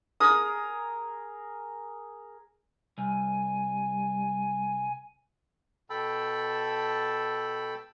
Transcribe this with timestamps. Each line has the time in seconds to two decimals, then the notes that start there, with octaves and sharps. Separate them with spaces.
0.20 G#4 A#4 D#6
2.98 C2 G3 G#5
5.90 B2 A4 G5 A5 B5 E6